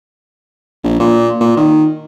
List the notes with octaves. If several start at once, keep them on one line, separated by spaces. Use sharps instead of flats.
A#1
A#2
A#2
D#3